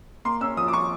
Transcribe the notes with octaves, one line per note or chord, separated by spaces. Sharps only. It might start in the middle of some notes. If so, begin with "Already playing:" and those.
A#3 C6
C#4 E6
F3 D#6
D6
F3 C#6